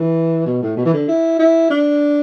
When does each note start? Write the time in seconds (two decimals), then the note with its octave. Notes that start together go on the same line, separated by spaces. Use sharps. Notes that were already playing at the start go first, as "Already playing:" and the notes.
Already playing: E3
0.46 B2
0.62 A2
0.77 B2
0.85 E3
0.93 D3
1.08 E4
1.39 E4
1.70 D4